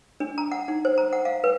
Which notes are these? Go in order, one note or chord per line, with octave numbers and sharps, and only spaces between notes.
D4
A#5
F#5
D#4
C5
A#5
F#5
F5
B4